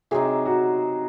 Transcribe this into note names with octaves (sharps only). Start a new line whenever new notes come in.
C3 F#3 C4 D#4 G#4
F#4